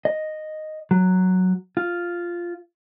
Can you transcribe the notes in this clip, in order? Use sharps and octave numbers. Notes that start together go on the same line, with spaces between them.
D#5
F#3
F4